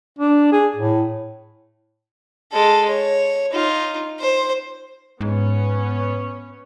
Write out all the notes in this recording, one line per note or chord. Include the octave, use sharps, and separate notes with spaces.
D4
G#4
A2
G#3 A4
C#5
D#4 F4
C5
G#2 B3 C#4 C#5